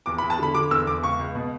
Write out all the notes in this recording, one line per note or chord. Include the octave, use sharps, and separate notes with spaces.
E2 D6
B5
E2
A5
D3 B5
D3 D6
E2 E6
E2 D6
C#2 C#6
C#2
B2